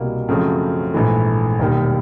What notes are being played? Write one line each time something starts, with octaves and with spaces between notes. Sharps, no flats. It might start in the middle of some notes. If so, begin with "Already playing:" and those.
Already playing: C2 B2 G3 A#3
F#2 C#3 F3 A3 C4
A#1 G#2 E3 A3
E1 D#2 D#3 G3